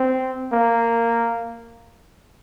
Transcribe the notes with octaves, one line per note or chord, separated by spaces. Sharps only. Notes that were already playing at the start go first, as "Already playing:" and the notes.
Already playing: C4
A#3